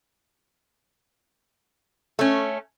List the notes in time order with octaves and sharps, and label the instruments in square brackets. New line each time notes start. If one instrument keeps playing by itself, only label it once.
[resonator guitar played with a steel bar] A3 C#4